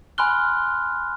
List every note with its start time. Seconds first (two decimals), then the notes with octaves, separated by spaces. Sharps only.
0.18 G#5 B5 C6 F6 F#6 G7